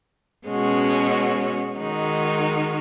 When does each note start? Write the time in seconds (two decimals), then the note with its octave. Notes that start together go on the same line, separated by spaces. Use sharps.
0.46 B2 G#3 C#4 F#4
1.79 D#3 G#3 D#4 F#4